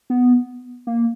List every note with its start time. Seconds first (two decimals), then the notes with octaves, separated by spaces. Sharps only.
0.10 B3
0.87 A#3